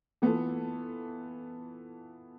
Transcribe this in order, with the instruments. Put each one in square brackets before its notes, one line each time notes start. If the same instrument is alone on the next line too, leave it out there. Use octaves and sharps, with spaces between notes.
[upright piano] E3 B3 F4 A4